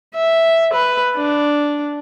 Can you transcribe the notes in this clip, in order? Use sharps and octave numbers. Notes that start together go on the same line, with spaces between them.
E5
B4
D4